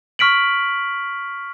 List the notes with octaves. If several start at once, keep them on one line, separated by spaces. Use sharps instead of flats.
C#6 F6 B6 D7 F#7